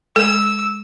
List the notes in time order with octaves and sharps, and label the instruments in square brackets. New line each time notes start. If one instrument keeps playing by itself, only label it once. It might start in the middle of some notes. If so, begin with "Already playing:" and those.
[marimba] G#3 [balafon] A4 [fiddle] E6